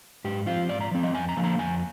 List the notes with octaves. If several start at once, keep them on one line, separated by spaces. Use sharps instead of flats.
G#2 G4
F3 C4 F4
G#2 D5
A#5
F3 C4
D#5
F2 G#5
A#5
D3 F3 A#3
A#5
F2 G#5